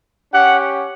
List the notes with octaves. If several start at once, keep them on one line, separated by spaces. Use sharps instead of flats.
C#4 G4 F#5